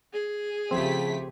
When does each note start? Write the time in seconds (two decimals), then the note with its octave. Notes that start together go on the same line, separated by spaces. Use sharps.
0.13 G#4
0.71 C#3 F3 A3 C4 G4 B6